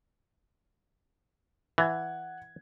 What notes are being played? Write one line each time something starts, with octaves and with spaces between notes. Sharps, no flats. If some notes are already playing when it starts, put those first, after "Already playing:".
E3 F#5 G#6